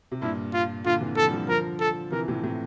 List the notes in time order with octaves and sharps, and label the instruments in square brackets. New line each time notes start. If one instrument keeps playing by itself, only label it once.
[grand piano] C3
[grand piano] G2 A#2 [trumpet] E4
[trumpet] F4
[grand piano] A#2 D3 [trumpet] F4
[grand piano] C3 E3
[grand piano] D3 F3 [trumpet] A4
[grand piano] G3
D3 F3
[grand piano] D3 F3 [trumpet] A#4
[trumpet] A4
[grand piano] C3 E3 [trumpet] A#4
[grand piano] A2 C3
A2 C3